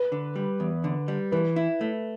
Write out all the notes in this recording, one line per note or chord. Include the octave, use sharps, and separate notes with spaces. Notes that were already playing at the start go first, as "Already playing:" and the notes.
Already playing: B4
D3
G3
E2
D3
G3
E3 B4
E4
A3